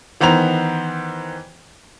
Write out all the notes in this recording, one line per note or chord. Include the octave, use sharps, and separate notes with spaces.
D#3 E3 B3 C5 A#5 F7